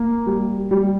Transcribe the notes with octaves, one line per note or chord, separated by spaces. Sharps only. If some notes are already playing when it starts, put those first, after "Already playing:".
Already playing: A#3
G3
G3